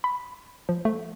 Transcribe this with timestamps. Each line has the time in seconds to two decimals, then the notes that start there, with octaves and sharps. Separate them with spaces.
0.04 B5
0.69 F3
0.85 A3